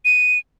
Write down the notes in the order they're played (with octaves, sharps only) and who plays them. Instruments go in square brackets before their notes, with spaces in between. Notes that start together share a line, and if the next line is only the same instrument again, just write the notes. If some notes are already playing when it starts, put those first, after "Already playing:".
[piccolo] D#7